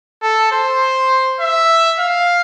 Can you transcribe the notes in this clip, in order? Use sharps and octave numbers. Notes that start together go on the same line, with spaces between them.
A4
C5
E5
F5